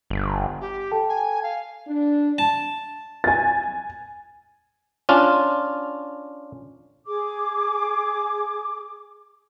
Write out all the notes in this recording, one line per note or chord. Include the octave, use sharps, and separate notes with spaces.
G1
G4
A4 G5 A5
G#5
F5
D4
A5
G#5 A6
C#4 D4 F4
G#4 D6